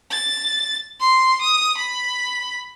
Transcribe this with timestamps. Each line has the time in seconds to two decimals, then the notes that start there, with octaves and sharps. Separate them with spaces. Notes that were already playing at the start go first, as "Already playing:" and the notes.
0.11 A6
1.00 C6
1.42 D#6
1.78 B5